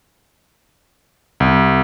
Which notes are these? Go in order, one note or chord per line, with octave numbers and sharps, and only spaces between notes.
C2